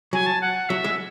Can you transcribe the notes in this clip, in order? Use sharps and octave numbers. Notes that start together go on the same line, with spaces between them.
F#3 G#5
A5
F#5
F#3 E5
G#3